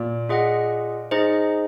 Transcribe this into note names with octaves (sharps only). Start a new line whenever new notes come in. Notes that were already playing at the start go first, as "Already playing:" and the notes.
Already playing: A#2
F4 G#4 D#5 F#5
D#4 G#4 C5 D#5